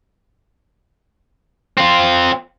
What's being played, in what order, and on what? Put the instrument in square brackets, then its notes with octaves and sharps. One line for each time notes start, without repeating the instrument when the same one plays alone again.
[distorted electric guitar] C4 F4